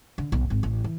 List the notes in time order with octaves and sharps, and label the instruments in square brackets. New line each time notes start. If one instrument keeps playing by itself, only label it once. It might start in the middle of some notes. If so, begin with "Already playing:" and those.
[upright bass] D3
B1
G#1
A1
E3